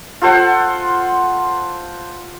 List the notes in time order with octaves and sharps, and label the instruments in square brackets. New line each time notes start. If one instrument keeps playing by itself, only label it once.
[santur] F4 A4 C5 F#5